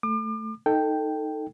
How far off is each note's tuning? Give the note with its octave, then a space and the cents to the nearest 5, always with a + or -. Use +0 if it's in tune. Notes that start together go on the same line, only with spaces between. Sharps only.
A3 +0 D6 +40
D#4 +0 A4 +15 G5 +0